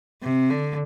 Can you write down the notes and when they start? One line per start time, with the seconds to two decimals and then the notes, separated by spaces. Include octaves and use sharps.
0.22 C3
0.50 D3